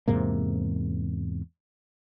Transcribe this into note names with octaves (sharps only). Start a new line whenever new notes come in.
E2 G#2 C3 A#3